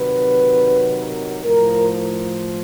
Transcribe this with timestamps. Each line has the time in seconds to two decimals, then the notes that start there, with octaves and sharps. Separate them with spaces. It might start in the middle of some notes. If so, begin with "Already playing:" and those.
Already playing: C3 D#3 F#3 B4
1.01 A#4
1.44 A2 F3 A#4